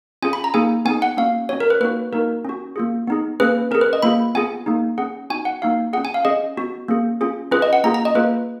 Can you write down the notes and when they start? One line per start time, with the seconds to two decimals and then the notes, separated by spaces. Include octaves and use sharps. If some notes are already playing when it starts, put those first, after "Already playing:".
0.22 C#4 F4 G#4 G#5
0.33 B5
0.44 A#5
0.54 A#3 D#4 G#4 G#5
0.85 B3 D#4 G#4 G#5
1.02 F#5
1.17 A#3 C#4 F#4 F5
1.49 C#4 F#4 C#5
1.60 A#4
1.70 B4
1.80 A#3 D#4 F#4 B4
2.12 A#3 D#4 F#4 A#4
2.45 C#4 F#4
2.76 A#3 F4 G#4
3.07 B3 D#4 G#4
3.40 A#3 C#4 G#4 B4
3.71 C#4 A#4
3.75 G#4
3.81 B4
3.93 D#5
4.02 A#3 F4 G#4 B5
4.35 B3 F4 G#4 G#5
4.66 A#3 D#4 G#4
4.98 C#4 G#4 F#5
5.30 B3 D#4 F#4 G#5
5.45 F#5
5.62 A#3 D#4 F#4 F5
5.93 C#4 F4 G#4 F#5
6.05 G#5
6.14 F5
6.25 C#4 G#4 D#5
6.57 B3 F#4
6.88 A#3 C#4 G#4
7.21 C#4 F4 G#4
7.51 C#4 F4 G#4 B4
7.62 D#5
7.73 F#5
7.84 A#3 C#4 F4 G#4 A#5
7.94 A#5
8.05 D#5
8.15 A#3 F4 G#4 B4